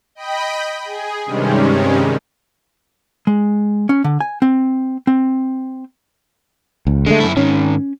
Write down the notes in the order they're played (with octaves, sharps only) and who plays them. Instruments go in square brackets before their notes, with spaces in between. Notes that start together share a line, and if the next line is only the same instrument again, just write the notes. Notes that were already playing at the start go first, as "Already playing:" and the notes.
[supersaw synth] D#5 G5 B5
G#4
G2 C3 D#3 G3 G#3 C#4
[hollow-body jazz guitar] G#3
C#4
D3
G#5
C4
C4
[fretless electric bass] C#2
[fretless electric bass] D3 A3 [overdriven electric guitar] G#3
[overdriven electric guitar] F#2 E4
[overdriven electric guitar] G#2 D#3 [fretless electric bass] C#4